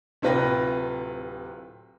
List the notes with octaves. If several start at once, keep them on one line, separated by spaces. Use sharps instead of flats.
D1 C3 F4 B4 G5 A#6